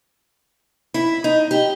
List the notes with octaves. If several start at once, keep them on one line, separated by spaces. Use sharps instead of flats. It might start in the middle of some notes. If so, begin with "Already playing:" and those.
E4
D#4
G4